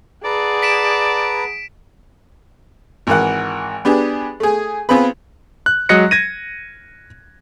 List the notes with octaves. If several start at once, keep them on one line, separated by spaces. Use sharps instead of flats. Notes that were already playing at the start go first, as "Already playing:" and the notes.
G#4 B4 D5 F#5 A5 A#5
B6 D7 E7
G#1 E3 A#4 F#5
B3 D4 G4 G#4
A3 G#4
B3 C4 F4 G#4 B4
F#6
F#3 G#3 D#5 F#6 A#6 C#7
G#6 A#6 D#7